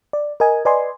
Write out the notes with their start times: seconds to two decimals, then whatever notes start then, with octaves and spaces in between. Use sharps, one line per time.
0.13 D5
0.40 A#4 D#5 G#5
0.65 B4 D5 D#5 G#5 C6